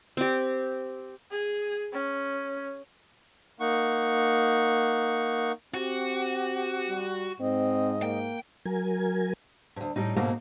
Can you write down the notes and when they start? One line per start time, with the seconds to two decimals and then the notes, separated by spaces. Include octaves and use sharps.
0.17 C4 G4
1.31 G#4
1.93 C#4
3.60 A#3 D#4 F#5 C#6
5.74 C4 F#4 G4
6.89 G3
7.40 G#2 C4 D#5
8.02 A#3 G5
8.65 F#3 A#4 G#5
9.76 D2 G2
9.96 A2 G3 D#4
10.16 G#2 B2 A3 A#3